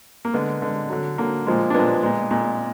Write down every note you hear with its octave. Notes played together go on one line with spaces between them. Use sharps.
A#3
D3 G#3 B3
D3 G#3
D3 F#3
D3 F#3 A#3
A#2 F3 G#3
D4
A#2 F3 G#3 B3
A#2 G#3
A#2 G#3